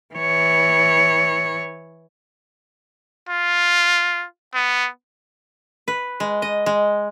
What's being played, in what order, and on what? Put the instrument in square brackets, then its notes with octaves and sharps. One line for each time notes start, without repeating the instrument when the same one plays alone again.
[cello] E3 C#5
[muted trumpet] F4
B3
[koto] B4
G#3
D#5
G#3